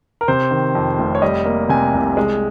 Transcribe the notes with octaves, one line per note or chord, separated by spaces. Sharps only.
A#4
C3 C5
D#3
F2
F1
C#5
G3 D#5
A#3
C3 G#5
C2
G#3